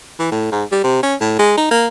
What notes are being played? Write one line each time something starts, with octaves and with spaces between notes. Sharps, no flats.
E3
A2
G#2
G3
C3
C#4
A2
G#3
D#4
A#3